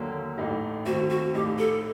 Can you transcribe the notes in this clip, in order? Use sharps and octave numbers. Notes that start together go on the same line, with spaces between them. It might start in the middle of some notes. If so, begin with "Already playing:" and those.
Already playing: D#2 D3 F#3 A#3
A1 A2 A3 D#4 G4
D#2 D#3 A3 C4 F#4
F#4
A#1 A2 A3 D#4 G4
A4